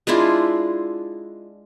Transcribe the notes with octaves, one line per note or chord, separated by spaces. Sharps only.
G#3 D4 E4 F4